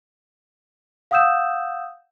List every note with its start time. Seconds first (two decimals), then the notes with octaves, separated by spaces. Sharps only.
1.11 F5 F#5 D#6 E6 G6 E7